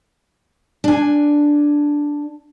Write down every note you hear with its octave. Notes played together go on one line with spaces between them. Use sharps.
D4 G#5